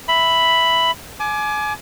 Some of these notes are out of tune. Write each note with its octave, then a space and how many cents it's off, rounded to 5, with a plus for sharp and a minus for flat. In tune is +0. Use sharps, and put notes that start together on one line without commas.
E5 +0 B5 +5
G#5 +30 D6 +10